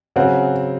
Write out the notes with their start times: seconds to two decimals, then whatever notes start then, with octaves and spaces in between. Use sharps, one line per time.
0.16 C#3 F#3 C4 F#5